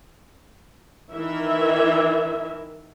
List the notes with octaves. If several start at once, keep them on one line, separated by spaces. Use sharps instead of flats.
D#3 E3 A#4 E5